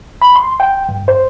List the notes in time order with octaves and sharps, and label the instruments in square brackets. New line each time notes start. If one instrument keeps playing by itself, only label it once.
[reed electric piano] B5
C6
G5
G2
C5